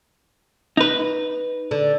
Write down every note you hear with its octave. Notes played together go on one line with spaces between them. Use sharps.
D#4 B4
D3